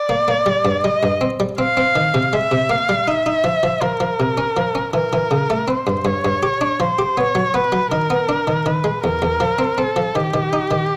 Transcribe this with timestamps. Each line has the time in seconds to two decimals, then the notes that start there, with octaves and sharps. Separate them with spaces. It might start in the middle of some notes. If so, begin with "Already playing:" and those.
Already playing: D5
0.09 A#3
0.28 A#3
0.46 G3
0.65 G2
0.84 G3 D#5
1.03 G2
1.21 C4
1.40 G3
1.58 C4 F5
1.77 C4
1.96 D#3
2.14 C3
2.33 G#3 E5
2.52 C3
2.70 A#3 F5
2.89 G3
3.07 D#4 E5
3.26 D#4
3.44 F3
3.63 F3
3.81 F3 A#4
4.00 F3
4.20 C3
4.38 C#4
4.57 F3
4.75 C#4
4.94 E3 A#4
5.13 E3
5.31 C#3
5.50 A3
5.68 C4 C5
5.87 G2
6.05 G2 C#5
6.25 G2
6.43 G4
6.61 D4
6.80 F3 C5
6.99 G4
7.17 B3 C#5
7.35 F#3
7.54 B3 B4
7.72 F#3
7.91 D#3 A#4
8.10 B3
8.29 D4
8.47 D#3
8.66 D#3 B4
8.84 G#3
9.03 E2 A#4
9.22 E2
9.40 F3
9.59 C4
9.78 C4 A4
9.96 F3
10.15 D#3 G4
10.34 D#3
10.53 D#4
10.71 D#3